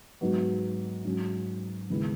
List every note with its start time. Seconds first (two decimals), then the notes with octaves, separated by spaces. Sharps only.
0.21 G#2 F#3 B3 F#4
1.05 G#2 F#3 C#4
1.90 D#2 C#3 G#3 B3 E4